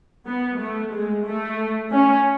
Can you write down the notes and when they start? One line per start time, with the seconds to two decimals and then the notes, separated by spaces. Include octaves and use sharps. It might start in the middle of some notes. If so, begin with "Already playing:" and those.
0.27 B3
0.60 A3
0.93 G#3
1.25 A3
1.91 C#4